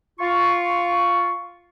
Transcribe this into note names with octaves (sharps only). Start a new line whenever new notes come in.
F4 C#6